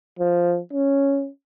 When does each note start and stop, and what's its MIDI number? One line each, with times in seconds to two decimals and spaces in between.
0.19 0.59 53
0.73 1.29 61